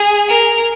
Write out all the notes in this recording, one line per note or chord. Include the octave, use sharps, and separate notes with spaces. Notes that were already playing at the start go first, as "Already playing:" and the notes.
Already playing: G#4
A#4